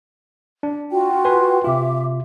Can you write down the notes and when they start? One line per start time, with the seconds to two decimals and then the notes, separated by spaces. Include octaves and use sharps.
0.63 D4
0.91 F4 F#4 G5
1.25 B4 G#5 C6
1.64 C3 F4 E5 D6